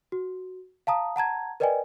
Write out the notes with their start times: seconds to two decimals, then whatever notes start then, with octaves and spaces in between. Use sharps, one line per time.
0.12 F#4
0.87 F5 A5 A#5 D#6
1.16 F#5 A5 A#5 G#6
1.60 A#4 B4 D5 D#5 G5 G#5